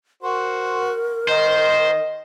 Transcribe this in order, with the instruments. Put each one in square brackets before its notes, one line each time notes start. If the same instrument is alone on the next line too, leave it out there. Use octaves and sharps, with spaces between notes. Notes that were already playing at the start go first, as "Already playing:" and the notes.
[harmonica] F#4 C5 [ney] A#4
[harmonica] D#3 [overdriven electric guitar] C5 [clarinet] D#5